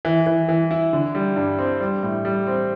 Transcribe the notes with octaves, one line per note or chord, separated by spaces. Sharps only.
E3
E3
E3
E4
D3
G3
G2
C4
G3
A2
G3
C4